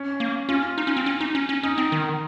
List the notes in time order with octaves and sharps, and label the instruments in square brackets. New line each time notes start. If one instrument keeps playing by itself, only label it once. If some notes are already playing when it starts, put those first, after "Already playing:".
Already playing: [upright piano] C#4
[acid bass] A#3
[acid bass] C#4 [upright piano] F4
[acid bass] D#4
C#4
C4
C#4
D#4
C#4
C#4
[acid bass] C#4 [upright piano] D#4
[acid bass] C4
D#3